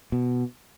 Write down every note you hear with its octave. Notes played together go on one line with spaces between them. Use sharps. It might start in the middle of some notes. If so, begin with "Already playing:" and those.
B2